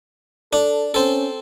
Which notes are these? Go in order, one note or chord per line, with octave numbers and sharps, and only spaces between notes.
D4 A4
C4 C#4 A4